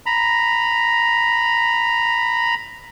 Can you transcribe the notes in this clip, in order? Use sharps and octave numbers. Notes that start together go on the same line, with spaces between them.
A#5 B5